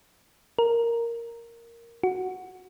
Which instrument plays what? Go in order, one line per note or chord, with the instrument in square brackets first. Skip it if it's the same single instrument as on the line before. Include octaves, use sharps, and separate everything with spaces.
[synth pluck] A#4
F#4